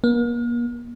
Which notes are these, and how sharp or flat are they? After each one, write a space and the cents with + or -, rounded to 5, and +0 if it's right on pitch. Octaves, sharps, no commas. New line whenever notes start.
A#3 +40